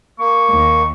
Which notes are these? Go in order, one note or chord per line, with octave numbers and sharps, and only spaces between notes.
A#3 C#6
D#2